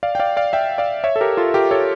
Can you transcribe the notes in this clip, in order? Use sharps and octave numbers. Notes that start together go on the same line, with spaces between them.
D5 F5
G5
D5 F5
D5 F5
E5 G5
D5 F5
C#5 E5
A4
G4 A#4
F4 A4
G4 A#4
A4 C#5